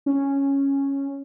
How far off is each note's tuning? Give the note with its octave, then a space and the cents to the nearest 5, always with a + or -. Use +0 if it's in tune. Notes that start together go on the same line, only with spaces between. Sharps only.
C#4 -5